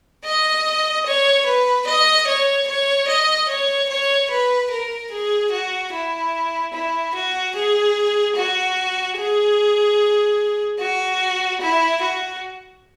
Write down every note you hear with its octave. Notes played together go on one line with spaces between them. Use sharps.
D#5
C#5
B4
D#5
C#5
C#5
D#5
C#5
C#5
B4
A#4
G#4
F#4
E4
E4
F#4
G#4
F#4
G#4
F#4
E4
F#4